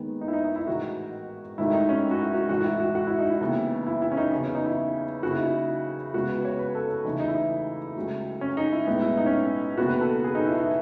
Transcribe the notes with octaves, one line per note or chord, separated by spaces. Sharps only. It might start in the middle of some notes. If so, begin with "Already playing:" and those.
Already playing: D#2 D#3 G#3 B3
D#4
E4
D#4
D#4
E4
A1 G#2 D#3 G#3 F#4
G#1 G#2 D#3 F#3 A3 E4
D#4
C#4
F#4
E4
F#4
A1 G#2 D#3 A3 F#4
F#4
E4
F#4
F#4
E4
D#4
E4
D#2 C#3 E3 B3
E4
E4
C#4
D#4
E2 C#3 F#3 B3 D#4
C#4
D#4
E4
D#2 C#3 F#3 F#4
E4
D#4
E4
C#2 C#3 G#3 B3 F#4
B4
C#5
B4
A4
A4
E2 C#3 E3 A3 D#4
D#4
E4
D#4
C#2 C#3 F#3 A3
C#4
D#4
E4
B1 A2 G#3 B3 D#4
E4
D#4
C#4
D#4
E1 D#2 C#3 E3 B3 F#4
B4
A4
G#4
D#4
E4
E4